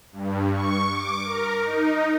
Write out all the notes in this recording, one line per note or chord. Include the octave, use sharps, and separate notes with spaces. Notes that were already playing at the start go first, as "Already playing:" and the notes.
G2
C#6
D6
A#4
D#4